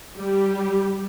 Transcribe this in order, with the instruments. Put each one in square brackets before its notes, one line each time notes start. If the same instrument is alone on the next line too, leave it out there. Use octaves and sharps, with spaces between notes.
[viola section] G3 G4